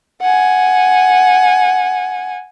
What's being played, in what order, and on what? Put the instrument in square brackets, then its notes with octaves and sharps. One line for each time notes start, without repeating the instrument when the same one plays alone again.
[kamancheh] F#5 G#5